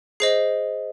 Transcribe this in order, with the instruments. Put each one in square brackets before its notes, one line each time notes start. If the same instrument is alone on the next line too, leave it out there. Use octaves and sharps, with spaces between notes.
[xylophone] G#4 C5 D#5 C7